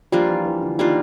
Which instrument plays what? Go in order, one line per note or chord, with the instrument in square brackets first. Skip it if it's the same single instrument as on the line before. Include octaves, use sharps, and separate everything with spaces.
[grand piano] F3 [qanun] G3 A#3 D4 F4
[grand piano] E3
E3
D3
[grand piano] D#3 [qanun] G3 A#3 D4 F4